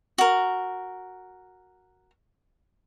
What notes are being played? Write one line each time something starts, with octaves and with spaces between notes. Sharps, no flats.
F#4 A#4